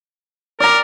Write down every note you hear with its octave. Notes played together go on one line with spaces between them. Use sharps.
A#4 D5 A#5